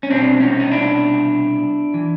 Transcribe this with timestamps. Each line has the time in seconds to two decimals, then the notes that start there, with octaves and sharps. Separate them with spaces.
0.03 C#4
0.10 C2 B2 C4 D4
0.40 C#4 D#4
0.60 D#4
0.71 D4 E4
1.94 E3